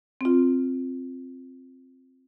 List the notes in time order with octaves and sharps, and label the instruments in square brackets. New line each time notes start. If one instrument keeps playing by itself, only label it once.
[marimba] C4 F4